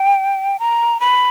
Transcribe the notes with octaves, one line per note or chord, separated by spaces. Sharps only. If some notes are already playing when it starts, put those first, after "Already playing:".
Already playing: G5
A#5
B5